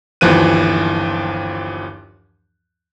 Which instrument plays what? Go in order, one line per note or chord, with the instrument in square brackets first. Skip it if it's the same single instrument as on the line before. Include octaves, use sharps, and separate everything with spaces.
[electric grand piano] G1 D#2 E3 F3 F#6 D#7